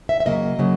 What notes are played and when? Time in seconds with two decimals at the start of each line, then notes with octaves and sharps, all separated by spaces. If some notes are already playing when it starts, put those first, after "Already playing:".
0.09 E5
0.20 E5
0.25 C#3 F#3 A#3 D#5
0.59 C#3 F#3 A#3